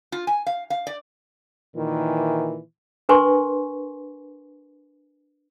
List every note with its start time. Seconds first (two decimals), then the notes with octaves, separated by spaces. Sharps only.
0.12 F4
0.27 G#5
0.46 F5
0.70 F5
0.87 D5
1.76 A#2 D#3 E3
3.09 D4 A#4 B4 G#5 C6 C#6